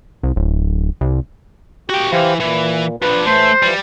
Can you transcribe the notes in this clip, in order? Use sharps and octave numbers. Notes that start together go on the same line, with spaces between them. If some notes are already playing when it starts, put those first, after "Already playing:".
C2
D1
C2
F#4 G4 G5
E3 G4 C5 F5
A#2 E3
F3 D4 B4 F#6
A2 E3 A3 C5
E3 F3 G3